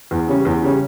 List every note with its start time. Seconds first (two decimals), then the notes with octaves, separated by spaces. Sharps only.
0.11 E2
0.28 C#3 G3 C#4
0.45 E2
0.63 C#3 G3 C#4